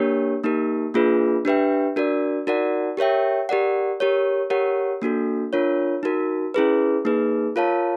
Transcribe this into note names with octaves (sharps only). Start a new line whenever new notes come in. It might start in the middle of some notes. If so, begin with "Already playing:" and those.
Already playing: A#3 D4 G4 A#4 C#5
A#3 D#4 G4 A#4
A#3 D4 F4 G#4 B4
D4 G4 B4 E5 G5
D4 F#4 A#4 D5
D#4 F#4 A#4 D5 F#5
G4 A#4 C#5 E5 G5
G4 A#4 D5 F#5
G4 A#4 C#5
G4 A#4 C#5 F#5
A#3 D4 F#4 A4
D4 F4 A#4 C#5
D#4 F#4 A#4
C#4 E4 G#4 B4
A#3 D#4 G#4 B4
F4 A#4 C#5 F5 A5